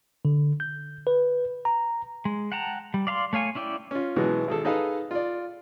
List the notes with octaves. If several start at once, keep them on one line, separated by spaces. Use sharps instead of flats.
D3
G6
B4
A#5
G#3
F#5 G5 A5 A#5
G3
D5 F5 A#5 C6
A3 C#5 F5 G#5
C#4 E4 D5 G5
C#4 F4
B2 E3 F#3 G#3
G#1 G#4 A4
D#4 G#4 A4 B4 D#5 F5
F4 D5